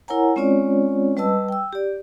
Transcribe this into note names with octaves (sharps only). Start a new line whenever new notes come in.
E4 A#4 C#5 F#5 G#5 A#5
G#3 C4 C#4 F4 C#5 D5
G3 B4 D#5 A5 E6
G5 E6
G4 D5